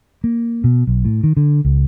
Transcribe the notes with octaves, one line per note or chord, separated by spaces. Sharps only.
A#3
B2
B1
A2
D#3
D3
C#2